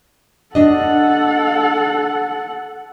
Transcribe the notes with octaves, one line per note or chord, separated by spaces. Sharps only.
D4 A4 D#5 F#5